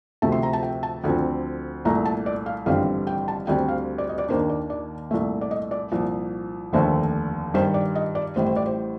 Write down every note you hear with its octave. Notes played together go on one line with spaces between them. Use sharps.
D2 C3 F3 A3 A5
C6
A#5
A5
G5
A5
D2 D3 F3 C4
C2 A#2 A3 A#5
A5
D5
F5
A1 G2 D3 G3 C4 F5
G5
A5
D2 D3 G3 C4 G5
F5
D5
D#5
D5
D#2 D#3 A#3 D4 C5
D5
D5
C2 A#2 A3
D5
D#5
D5
C2 A#2 F3
F1 D#2 D3 A3 C5
G2 D#3 G3 C5
D5
D#5
D5
A1 A2 G3 C5
C5
D5
C5